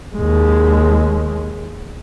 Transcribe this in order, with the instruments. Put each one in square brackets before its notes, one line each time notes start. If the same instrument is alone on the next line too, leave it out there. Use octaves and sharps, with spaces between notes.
[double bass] D#2 G#3